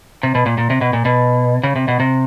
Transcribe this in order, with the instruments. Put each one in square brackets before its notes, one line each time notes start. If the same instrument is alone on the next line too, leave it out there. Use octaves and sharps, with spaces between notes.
[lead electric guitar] C3
B2
A#2
A#2
C3
B2
A#2
B2
C#3
C3
B2
C3